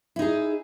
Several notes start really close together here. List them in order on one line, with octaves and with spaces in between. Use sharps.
E4 D#4 G#4